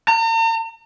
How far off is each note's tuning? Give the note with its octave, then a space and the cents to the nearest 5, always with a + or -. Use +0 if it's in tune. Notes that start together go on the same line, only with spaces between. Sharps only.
A#5 -45